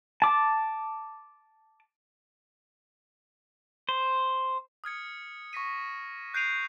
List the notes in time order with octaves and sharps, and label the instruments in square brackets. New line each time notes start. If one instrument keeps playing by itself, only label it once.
[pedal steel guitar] A5 D6
C5
[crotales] D#6 F6 G#6 C#7
C#6 A#6 B6 D#7
F#6 G6 C7 D7 D#7 F7